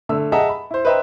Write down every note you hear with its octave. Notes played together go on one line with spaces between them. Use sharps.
D3 A3 E6
G#4 D#5 E5 F#5 A5 A#5
B5
E4 C5
B4 C5 D#5 E5 G5 A#5